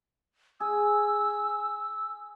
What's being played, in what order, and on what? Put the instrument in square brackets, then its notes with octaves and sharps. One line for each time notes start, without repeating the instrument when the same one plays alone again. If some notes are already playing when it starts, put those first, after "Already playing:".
[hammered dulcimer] G#4 [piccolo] E6